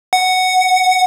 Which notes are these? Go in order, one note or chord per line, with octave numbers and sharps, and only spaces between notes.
F#5